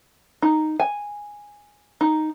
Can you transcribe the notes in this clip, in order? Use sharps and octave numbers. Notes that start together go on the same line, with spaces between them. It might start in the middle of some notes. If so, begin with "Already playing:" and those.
D#4
G#5
D#4